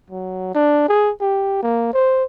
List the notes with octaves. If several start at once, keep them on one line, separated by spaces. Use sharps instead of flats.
F#3
D4
G#4
G4
A#3
C5